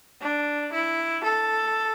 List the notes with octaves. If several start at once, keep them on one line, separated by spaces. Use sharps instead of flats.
D4
E4
A4